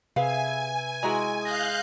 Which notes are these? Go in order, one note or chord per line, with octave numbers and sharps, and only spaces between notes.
C3 G#4 B4 E5 F5 G#5
G#3 E4 F#4 A#5
F5 D#6 F#6 G6 A#6